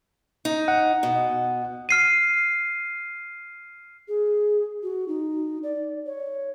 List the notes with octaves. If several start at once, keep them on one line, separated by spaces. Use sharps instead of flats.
D#4
F#5
B2
F6 C7 D#7
G#4
F#4
D#4
D5
C#5